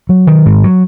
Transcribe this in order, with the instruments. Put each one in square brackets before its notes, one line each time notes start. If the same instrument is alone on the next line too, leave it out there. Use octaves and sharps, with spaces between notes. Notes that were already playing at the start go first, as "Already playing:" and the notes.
[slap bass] F#3
D#3
G#2
F#3